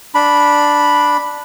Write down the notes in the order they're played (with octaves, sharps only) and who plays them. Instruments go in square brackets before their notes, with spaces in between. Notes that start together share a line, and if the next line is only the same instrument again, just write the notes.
[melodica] D4 B5